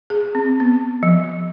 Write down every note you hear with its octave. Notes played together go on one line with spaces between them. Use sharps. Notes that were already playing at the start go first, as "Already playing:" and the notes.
G#4
C4
B3
F3